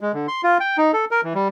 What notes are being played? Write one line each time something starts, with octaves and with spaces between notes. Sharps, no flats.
G#3
D3
C6
F4
G5
D#4
A4
A#4
E3
G3